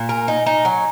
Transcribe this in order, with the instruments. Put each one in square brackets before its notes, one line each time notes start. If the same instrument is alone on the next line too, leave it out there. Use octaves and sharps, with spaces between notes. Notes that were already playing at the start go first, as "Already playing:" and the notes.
Already playing: [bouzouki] A#2
[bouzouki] A#4 [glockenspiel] G#5
[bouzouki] D#4
[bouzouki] D#4 [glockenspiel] A#5
[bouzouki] F#3